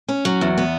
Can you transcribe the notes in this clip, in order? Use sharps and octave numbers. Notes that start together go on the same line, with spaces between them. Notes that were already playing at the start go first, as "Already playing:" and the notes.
C#4
F#3
E2
B3